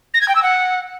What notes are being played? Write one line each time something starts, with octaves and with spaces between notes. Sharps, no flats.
A#6
G#6
G5
E6
F#5